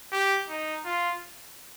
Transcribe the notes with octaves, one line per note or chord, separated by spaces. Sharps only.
G4
D#4
F4